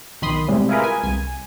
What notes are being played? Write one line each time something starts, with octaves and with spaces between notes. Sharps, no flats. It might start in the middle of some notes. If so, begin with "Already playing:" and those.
B1 D#3 B5 C6 D#6
A2 C3 G3 G#3
E4 F4 G#4 A#4 B4
G#5
C2 G#5